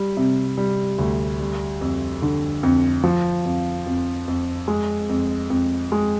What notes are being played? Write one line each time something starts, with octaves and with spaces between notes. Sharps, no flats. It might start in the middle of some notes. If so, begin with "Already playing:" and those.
Already playing: G3
C3
G3
D2
G3
F2
D3
F2
F3
F2
F2
F2
G#3
F2
F2
G#3